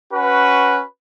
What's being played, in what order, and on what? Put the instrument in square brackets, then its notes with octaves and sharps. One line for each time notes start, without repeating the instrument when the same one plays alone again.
[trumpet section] C#4 F#4 B4